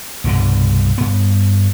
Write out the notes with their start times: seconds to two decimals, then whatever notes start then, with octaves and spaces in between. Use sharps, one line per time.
0.24 C2 G2 B2 D3
0.98 G2 B3